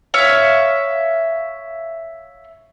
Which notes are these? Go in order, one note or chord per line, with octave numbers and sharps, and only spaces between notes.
C#5 E5 F5